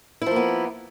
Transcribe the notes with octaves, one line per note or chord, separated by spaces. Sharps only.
F3 A#3 B3 E4